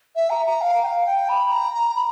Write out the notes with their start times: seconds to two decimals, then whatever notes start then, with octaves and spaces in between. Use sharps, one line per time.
0.15 E5
0.30 A#5
0.45 A#5
0.61 F5
0.83 G5
0.86 F5
1.05 G5
1.28 B5
1.51 A#5
1.73 A#5
1.95 B5